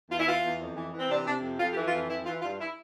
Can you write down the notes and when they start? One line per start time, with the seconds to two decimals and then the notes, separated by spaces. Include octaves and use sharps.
0.10 E2 F4
0.19 E4
0.27 E3 F4
0.44 E2
0.60 F2
0.76 E3
0.93 E3
0.98 C4
1.09 C3 D4
1.26 C3 D4
1.42 F2
1.59 F2 F4
1.72 G4
1.76 E3
1.84 F4
1.93 F2
2.09 E3 E4
2.25 E3 F4
2.42 G2 F4
2.59 E4